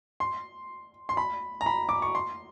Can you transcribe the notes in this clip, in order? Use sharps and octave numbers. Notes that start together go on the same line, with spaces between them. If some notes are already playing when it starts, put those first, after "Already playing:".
C6
C6
B5
A#5
B5
D6
C#6
C6